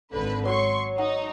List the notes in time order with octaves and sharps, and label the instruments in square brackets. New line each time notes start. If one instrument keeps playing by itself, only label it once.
[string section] G#1 D3 B4
[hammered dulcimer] F#3 C#5 [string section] C6 C#6
[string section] D#4 [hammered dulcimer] F#5